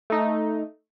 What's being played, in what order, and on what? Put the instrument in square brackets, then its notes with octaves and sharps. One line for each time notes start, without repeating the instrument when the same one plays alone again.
[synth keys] A3 D#4